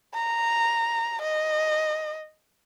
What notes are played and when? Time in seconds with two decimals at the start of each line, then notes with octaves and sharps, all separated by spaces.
0.14 A#5
1.21 D#5